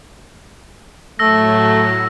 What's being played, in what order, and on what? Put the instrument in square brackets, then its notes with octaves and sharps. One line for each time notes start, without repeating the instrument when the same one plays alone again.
[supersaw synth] A2 F#3 [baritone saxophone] A3 [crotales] E6 A#6